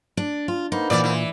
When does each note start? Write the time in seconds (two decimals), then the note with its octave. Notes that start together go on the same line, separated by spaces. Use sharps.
0.17 D4
0.48 F4
0.72 A#3 B3 D#4 C5
0.90 A#2 E3 D5
1.04 E3